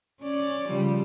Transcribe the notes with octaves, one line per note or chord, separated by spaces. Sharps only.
C#4 D5
C#3 F3 G3